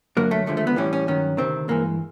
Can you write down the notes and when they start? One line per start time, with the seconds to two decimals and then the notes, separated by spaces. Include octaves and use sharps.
0.17 F#2 D3 F#3 A#3
0.31 A3
0.46 D#2 D3 F3 G#3 A3
0.57 A3
0.67 B3
0.76 A2 E3 G3 C#4
0.93 C#4
1.07 G2 D#3 F#3 C#4
1.37 D2 C3 D#3 C4
1.68 G2 E3 G#3 A#3